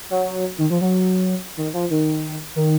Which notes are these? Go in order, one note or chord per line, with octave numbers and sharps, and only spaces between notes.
F#3
D#3
F3
F#3
D#3
F3
D#3
D#3